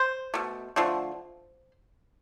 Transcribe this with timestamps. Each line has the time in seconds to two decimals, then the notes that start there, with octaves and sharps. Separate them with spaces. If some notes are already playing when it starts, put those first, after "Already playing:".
Already playing: C5
0.34 B2 A3
0.76 D3 F3 A3